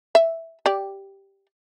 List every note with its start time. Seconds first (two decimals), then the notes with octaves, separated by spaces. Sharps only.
0.15 E5
0.66 G4 D5